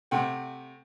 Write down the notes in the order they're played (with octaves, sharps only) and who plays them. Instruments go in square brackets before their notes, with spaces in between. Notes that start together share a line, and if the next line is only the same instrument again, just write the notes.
[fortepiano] C3 A3 F#5 G5